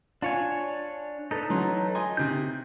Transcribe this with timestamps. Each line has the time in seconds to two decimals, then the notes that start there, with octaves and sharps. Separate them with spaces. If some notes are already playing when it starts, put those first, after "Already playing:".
0.22 D4 F4 C#5 G#5
1.31 D#4 A4 B4
1.50 E3 F#3 C6
1.95 D#5 G#5 C6
2.17 C3 D#3 G6